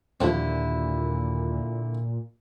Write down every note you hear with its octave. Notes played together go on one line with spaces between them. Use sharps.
D#2 A#2 D3 F3 A3 C4 E4